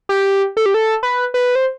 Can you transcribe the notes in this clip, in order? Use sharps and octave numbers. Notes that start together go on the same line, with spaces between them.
G4
A4
G4
A4
B4
B4
C5